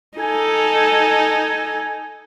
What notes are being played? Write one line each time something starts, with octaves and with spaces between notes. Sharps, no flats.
D#4 A4 G#5